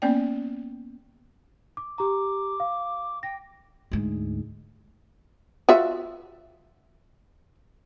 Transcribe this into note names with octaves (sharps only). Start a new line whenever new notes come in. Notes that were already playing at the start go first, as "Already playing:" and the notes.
A#3 B3 C#4 D5 G5
D6
G4 A#5 D6
F5
G5 A#6
D2 G#2
F4 F#4 E5